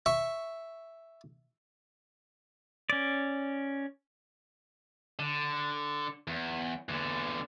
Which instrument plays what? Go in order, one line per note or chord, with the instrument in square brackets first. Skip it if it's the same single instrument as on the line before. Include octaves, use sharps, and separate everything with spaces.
[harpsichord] E5 C#6
[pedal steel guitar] C#4 D5
[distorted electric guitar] D3
E2
E2 D3